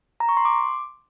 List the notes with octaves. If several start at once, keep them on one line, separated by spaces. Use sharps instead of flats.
A#5
C#6
C6
D6